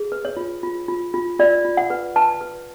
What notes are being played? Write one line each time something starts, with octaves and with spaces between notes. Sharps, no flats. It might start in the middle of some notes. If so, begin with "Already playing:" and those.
Already playing: G#4
B4
C#5
F4
F4
F4
F4
F4 D5
F4
F#5
B4
B4 A5
B4